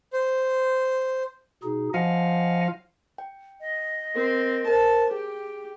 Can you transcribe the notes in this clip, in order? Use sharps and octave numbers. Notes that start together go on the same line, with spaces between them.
C5
B2 D#4 G#4
F3 D#5 F5 F#5 G#5
G5
D#5
C4 A#4
A#4 C5 A5
G4 G#4 G5